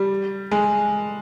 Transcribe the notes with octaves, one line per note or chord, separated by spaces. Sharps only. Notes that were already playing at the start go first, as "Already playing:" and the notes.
Already playing: G3
G#3